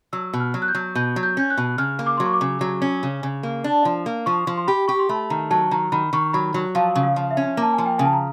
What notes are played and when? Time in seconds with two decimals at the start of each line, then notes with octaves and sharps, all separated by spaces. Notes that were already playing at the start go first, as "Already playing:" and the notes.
0.13 F#3 E6
0.33 B2
0.40 F6
0.54 F#3
0.62 F#6
0.68 G6
0.75 F#3
0.95 B2 G6
1.16 F#3
1.23 G6
1.37 C#4 G6
1.50 F#6
1.58 B2
1.78 C#3 F6
1.99 A#3
2.06 D6
2.17 F#3 C6
2.26 C#6
2.33 D6
2.41 C#3
2.61 F#3
2.82 C#4
3.03 C#3
3.23 C#3
3.43 A#3
3.64 D4
3.85 F3
4.06 A#3
4.26 F3 C#6
4.47 F3
4.57 C6
4.67 G4 B5
4.88 G4 C#6
4.99 C6
5.09 A3 B5
5.30 D#3 A#5
5.51 F#3 A5
5.71 D#3 A#5
5.92 D#3 B5
6.13 D#3 C#6
6.33 F#3 B5
6.54 F#3
6.75 F3 F5
6.96 C#3
7.03 F5
7.16 F3
7.31 E5
7.37 C#4
7.57 A#3 A5
7.73 F3 G#5
7.86 G5
7.98 C#3 G#5
8.05 A5
8.13 A#5